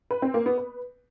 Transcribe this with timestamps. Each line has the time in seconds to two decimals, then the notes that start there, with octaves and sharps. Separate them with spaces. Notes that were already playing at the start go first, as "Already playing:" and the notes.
0.11 B4
0.22 C4
0.34 A#3
0.46 B3
0.58 B4